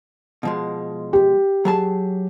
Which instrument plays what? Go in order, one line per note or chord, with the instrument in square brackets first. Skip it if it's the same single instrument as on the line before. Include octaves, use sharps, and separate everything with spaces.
[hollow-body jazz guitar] B2 F3 G#3
[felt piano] G4
[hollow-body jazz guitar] F#3 G#4 A5